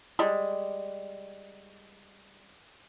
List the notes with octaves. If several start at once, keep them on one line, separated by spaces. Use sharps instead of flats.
G3 G#3